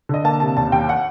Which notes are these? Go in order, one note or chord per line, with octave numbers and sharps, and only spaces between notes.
D3 D#5
A#3 A5
C3 A5
D#2 A5
D#2 G5
F#5